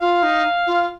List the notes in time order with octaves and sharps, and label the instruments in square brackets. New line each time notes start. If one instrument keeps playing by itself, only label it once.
[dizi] F4 [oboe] F5
[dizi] D#4
F4